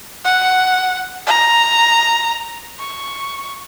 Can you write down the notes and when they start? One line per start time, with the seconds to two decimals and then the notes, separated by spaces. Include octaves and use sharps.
0.25 F#5
1.27 A#5
2.80 C#6